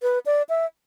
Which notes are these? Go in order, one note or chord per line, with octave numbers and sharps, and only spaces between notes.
B4
D5
E5